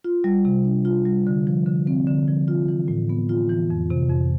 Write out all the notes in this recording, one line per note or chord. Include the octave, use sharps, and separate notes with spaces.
F4
G3
C3
D4
F4
G3
D3
F3
D3
C4
D3
F3
F4
E3
A2
B3
F4
E3
F2
C3
F2